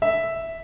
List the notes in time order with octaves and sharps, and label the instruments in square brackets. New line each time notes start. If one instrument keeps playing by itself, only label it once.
[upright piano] E5